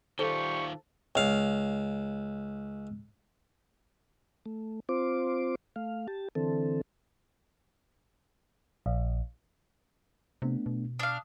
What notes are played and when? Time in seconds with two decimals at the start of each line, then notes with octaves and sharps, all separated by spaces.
0.19 D#3 G3 F4 G4 A4 C5 C#6
1.15 C#2 F5
4.46 A3
4.89 C4 F4 C5 D6
5.76 A3 F5
6.08 G4 A5
6.35 D3 E3 C4 A4
8.86 A#1
10.42 C3 A3 B3 D4
10.66 B2
10.99 D4 F5 D#6